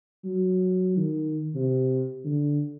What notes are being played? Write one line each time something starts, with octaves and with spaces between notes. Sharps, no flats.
F#3
D#3
C3
D3